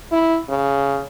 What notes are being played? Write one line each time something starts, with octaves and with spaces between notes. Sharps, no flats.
E4
C#3